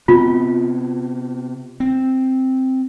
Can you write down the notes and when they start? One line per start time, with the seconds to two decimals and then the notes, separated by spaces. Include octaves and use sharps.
0.08 C3 B3 C4 F4
1.80 C4